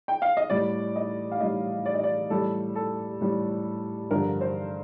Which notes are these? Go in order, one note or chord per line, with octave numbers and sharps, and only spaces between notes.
G5
F5
D#5
A2 G3 D5
D#5
F5
A2 G3 D#5
D5
D#5
D5
A2 G3 A4
A4
A2 G3
G2 D3 F3 A#4
C5